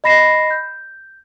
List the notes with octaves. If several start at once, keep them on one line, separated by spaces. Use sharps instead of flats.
D#5 B5 A#6 C7 E7
G6